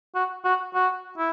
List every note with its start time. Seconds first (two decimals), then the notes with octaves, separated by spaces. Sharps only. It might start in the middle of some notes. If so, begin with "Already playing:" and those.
0.15 F#4
0.45 F#4
0.74 F#4
1.18 E4